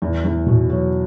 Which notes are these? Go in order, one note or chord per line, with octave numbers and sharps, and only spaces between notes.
E2
E2
B2
F#3